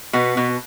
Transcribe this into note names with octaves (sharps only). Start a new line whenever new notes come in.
B2 B3
B2